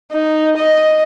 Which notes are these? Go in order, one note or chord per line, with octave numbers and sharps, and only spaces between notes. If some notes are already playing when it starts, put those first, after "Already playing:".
D#4
D#5